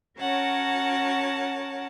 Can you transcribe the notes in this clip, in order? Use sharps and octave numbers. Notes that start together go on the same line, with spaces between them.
C#4 F#4 A#4 C#5 F#5 A5